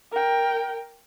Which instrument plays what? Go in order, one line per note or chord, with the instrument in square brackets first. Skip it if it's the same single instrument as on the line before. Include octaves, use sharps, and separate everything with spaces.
[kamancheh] A#4 G5